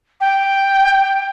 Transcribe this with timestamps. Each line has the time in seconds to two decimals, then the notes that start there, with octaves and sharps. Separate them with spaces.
0.20 G5